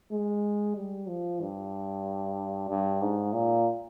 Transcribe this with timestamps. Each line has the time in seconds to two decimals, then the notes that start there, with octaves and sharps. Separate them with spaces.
0.12 G#3
0.77 G3
1.08 F3
1.41 G2
2.69 G2
3.02 G#2
3.33 A#2